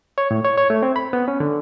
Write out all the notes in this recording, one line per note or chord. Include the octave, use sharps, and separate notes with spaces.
C#5
A2
C#5
C#5
A3
C4
B5
B3
C#4
D3